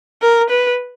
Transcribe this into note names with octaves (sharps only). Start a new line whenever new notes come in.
A#4
B4